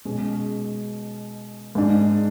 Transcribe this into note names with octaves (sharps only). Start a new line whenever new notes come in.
B2 G#3 C#4 G#4
G#2 G#3 D4